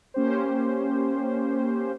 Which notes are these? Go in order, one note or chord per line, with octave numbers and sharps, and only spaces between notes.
A#3 C#4 G4 C5